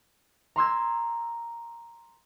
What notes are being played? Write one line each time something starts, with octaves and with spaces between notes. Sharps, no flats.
A#5 C6 E6 G#6